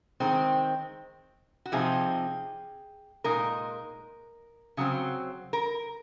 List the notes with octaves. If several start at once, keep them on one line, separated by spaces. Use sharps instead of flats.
D#3 G#3 C4
F#4
C3 F3 C4 D#4 G#4
A#2 G#3 D#4 A#4
C#3 F#3 C4
A#4